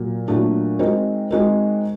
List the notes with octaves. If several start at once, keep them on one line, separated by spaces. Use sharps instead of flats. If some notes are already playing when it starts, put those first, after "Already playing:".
Already playing: A#2 F#3
A#2 F#3 A3 D4
G#3 C4 D#4 F#4 A#4
G#3 C4 D#4 F#4 A#4